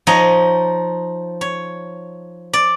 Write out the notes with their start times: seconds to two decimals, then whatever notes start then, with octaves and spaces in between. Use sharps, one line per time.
0.07 F3 D#4 C#5 D#5
1.41 C#5
2.53 D5